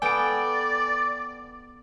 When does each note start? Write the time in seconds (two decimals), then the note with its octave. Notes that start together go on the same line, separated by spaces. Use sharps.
0.02 B3 A4 D5 G5 G#5 D7